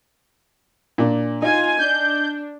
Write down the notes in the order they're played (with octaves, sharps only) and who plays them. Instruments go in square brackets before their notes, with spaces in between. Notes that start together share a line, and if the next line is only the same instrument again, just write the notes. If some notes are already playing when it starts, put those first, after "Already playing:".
[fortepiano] A#2 D4
[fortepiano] D#4 [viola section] F4 G#5
[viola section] D4 [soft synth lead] G6